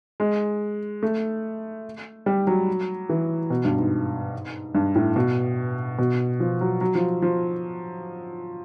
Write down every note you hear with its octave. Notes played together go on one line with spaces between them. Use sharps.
G#3
A3
G3
F#3
E3
B2
G2
G#2
G2
A2
B2
B2
F3
F#3
F#3
F3
F3